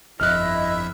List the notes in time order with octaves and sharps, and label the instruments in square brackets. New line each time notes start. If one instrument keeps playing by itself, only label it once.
[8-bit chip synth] G1 F2 E5 [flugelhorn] E4 [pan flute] D#5 [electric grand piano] F6 F#6